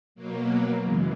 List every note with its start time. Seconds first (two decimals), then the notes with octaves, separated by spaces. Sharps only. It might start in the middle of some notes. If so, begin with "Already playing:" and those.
0.15 B2 F#3 A#3
0.83 F#2 C#3 E3 G#3